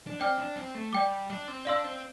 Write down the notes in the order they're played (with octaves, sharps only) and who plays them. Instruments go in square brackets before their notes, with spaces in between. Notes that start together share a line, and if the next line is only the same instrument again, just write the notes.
[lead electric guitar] D4
[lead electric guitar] C4 [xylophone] D5 G5 D6 F6
[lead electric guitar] D4
C4
A3
[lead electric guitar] G3 [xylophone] D5 G5 D6
[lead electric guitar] D4
C4
[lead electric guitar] D4 [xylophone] D5 F5 C6 E6
[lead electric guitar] C4